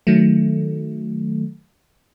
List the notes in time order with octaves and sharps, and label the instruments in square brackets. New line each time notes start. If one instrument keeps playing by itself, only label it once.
[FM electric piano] D#3 F#3 A3